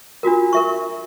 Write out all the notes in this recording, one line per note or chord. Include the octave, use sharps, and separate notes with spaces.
D4 F4 F#4 A#4
A#4 E5 C#6